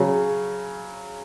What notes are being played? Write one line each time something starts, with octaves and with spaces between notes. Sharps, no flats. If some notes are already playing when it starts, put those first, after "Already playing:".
Already playing: C#3 F#3 C#4